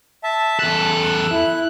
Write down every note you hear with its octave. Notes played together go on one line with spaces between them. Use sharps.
E5 A5
E2 A4 F#6
E4